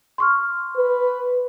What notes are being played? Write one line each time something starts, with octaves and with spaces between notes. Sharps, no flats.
C6 C#6 F6
B4